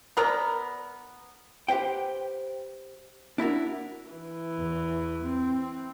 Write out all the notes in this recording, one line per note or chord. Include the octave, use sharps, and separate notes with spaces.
B3 A#4 D5 A#5
G4 B4 C5 G5
D4 E4 F#4 A#4
E3
E2
C4